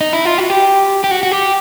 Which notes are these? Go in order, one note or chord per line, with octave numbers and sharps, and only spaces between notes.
D#4
E4
F4
F#4
G4
G4
F#4
F#4
G4